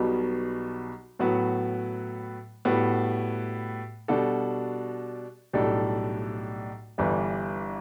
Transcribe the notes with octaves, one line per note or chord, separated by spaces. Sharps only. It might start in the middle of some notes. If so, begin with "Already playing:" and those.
Already playing: B1 B2 G3 B3
A2 F#3 B3 F#4
A2 G3 B3 F#4
B2 G3 D4 F#4 A4
B1 A2 G3 D4 A4
G1 G2 E3 G3 D4